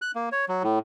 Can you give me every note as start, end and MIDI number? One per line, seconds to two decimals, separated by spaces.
0.02 0.11 90
0.15 0.29 58
0.32 0.45 73
0.49 0.63 54
0.63 0.79 45